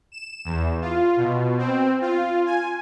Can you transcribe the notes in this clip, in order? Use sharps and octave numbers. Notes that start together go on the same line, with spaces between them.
E7
E2
F4
B2
C4
F4
G#5